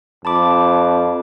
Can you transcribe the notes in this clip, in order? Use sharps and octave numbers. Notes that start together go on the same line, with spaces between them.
F2 A5 B5 D6